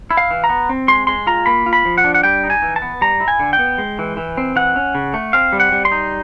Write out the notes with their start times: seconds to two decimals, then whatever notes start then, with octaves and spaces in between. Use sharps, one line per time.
0.11 E4
0.17 F5
0.31 E3
0.44 A#5
0.49 B3
0.69 C4
0.88 G#3 C6
1.07 G#3 C6
1.27 F4 A#5
1.46 A#3 B5
1.66 F4
1.73 B5
1.85 F3
1.98 F#5
2.04 D4
2.14 F#5
2.23 G3 G5
2.44 D#4
2.50 G#5
2.62 E3
2.76 A5
2.82 B3
3.01 G3 A#5
3.20 E4
3.28 G#5
3.40 D3
3.53 G5
3.59 B3
3.78 G#3
3.99 E3
4.17 E3
4.37 C4
4.56 E3 F#5
4.76 C#4
4.95 C#3
5.14 A3
5.33 C4 F5
5.53 G3
5.60 F#5
5.72 G3
5.85 C6
5.92 D#4